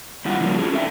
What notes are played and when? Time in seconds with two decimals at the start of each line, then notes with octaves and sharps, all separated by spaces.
0.25 D#3 G3 E4 F4 F#5
0.40 C#3 F3 G3 A3 A#3 C#4
0.59 C#4 D4 F4 G#4
0.73 A4 D5 E5 F5 G5